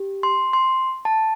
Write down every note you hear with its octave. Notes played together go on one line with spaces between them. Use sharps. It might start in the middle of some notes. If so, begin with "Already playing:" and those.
Already playing: G4
C6
C6
A5